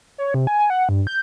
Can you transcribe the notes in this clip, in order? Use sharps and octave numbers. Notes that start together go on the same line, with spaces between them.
C#5
C3
G#5
G#5
F#5
G2
G6